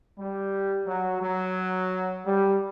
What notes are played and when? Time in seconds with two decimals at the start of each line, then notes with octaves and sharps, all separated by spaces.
0.18 G3
0.86 F#3
1.22 F#3
2.25 G3